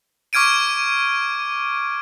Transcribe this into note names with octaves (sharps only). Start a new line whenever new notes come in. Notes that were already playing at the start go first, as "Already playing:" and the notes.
C#6 D6 F6 G#6 D7 D#7